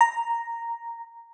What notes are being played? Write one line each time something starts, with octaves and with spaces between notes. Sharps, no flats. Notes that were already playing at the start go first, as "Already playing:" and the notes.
A#5